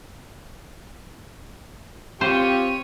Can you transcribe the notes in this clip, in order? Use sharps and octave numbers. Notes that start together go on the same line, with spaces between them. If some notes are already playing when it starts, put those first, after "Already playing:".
C4 F4 G4 C5 C#5 D#7